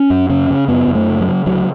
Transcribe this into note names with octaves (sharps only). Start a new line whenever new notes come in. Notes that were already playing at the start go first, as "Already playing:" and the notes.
Already playing: C#4
F#2
C#3 C#4
C#3
F#2 B3
F#2
A3
C#3
F#3
C#3
D2 F#3